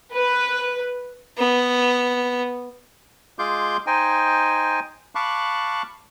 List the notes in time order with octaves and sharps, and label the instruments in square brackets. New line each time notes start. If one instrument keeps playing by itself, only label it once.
[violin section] B4
[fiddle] B3
[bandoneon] G#3 F4 G#4 C6 D6 G6
D#4 C5 D#5 G5 G#5
F5 A5 B5 C#6 D6 F#6